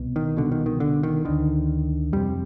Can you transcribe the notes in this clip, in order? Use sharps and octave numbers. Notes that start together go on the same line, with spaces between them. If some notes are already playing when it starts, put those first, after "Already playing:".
Already playing: C2 B2
D#3
C2 B2 D3
D#3
D#3
D3
D#3
D2 D3 D#3
F2 C3 G3